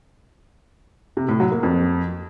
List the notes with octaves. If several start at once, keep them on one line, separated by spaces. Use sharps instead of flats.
C3
A2
F#3
A#3
F2